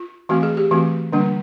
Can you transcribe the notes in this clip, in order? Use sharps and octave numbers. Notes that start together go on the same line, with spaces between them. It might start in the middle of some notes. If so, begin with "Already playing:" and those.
Already playing: F4
E3 A3 C4 F#4
G#4
G4
E3 A3 C4 F#4
D3 G3 A#3 D4